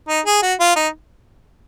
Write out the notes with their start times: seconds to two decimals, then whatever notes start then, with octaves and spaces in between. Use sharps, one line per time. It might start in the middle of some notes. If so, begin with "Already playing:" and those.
0.08 D#4
0.26 G#4
0.42 F#4
0.60 F4
0.76 D#4